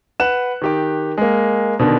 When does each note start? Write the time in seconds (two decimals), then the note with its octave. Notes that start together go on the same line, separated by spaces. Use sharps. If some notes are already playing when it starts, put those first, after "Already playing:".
0.20 B4 F#5 F#6 E7
0.62 D#3 G4 D6
1.18 G#3 A#3
1.79 B2 D3 D#3